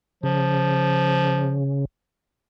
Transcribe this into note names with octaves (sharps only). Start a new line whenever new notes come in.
C#3 F3